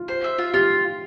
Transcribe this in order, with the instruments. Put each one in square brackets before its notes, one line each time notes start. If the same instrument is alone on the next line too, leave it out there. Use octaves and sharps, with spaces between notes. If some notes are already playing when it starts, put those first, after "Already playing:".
Already playing: [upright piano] F4
[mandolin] C5
E5
F4
[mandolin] F4 [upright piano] G4